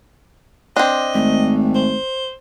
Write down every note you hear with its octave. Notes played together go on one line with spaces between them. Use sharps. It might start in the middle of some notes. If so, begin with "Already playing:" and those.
C4 D4 D#5
G#1 A3
C5